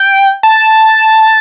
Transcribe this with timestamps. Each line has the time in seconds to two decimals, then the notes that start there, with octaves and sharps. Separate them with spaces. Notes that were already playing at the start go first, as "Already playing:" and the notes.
Already playing: G5
0.43 A5